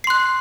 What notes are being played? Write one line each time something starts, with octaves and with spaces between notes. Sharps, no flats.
C6 F#6 C7